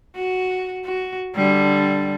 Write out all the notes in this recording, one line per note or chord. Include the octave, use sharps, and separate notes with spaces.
F#4
F#4
D3 G3